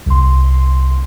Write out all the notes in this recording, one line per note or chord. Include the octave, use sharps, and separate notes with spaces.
C2 C6